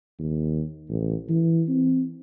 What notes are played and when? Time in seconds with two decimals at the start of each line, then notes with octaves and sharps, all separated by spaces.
0.19 D#2
0.89 A1
1.29 E3
1.68 C4